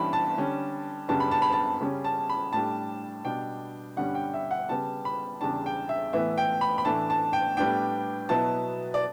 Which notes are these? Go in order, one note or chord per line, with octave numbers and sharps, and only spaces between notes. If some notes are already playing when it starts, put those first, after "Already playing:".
Already playing: G2 E3 G3 C#4 E4 A5 B5
A5
D3 G3 C#4
F#2 C#3 G3 B3 D4 A5
B5
A5
B5
A5
C#3 G3 C#4
A5
B5
A2 G3 D4 A5
B2 G3 D4 G5
G2 D3 G3 C#4 F#5
G5
E5
F#5
C#3 G3 B3 A5
B5
E2 C#3 G3 D4 A5
G5
E5
A2 E3 B3 E4 E5
G5
B5
B5
A2 E3 A3 D4 A5
A5
G5
A2 G3 B3 D4 G5
B2 F#3 B3 E4 A5
D5